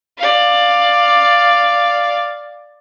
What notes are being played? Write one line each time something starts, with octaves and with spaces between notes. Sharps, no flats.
D5 F5